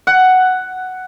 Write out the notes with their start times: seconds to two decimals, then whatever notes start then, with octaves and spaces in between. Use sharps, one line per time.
0.07 F#5